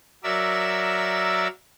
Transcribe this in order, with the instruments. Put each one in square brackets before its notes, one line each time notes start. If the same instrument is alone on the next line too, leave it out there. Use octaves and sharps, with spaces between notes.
[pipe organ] F#3 A#4 D5 E5 E6